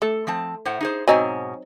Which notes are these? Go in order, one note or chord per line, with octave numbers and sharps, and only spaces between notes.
A3 A4
F3 C4 A5
A2 C5 F#5
D#4 G#4 C5
G#2 B2 F#3 C4 D#4 G#5